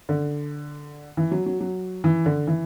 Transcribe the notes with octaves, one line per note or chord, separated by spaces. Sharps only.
D3
E3
F#3
F#3
F#3
E3
D3
E3